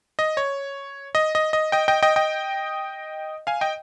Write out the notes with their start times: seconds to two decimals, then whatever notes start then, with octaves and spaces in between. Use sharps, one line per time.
0.19 D#5
0.37 C#5
1.15 D#5
1.35 D#5
1.53 D#5
1.72 D#5 G5
1.88 D#5 G5
2.02 D#5 G5
2.16 D#5 G5
3.47 F5 G#5
3.61 D#5 G5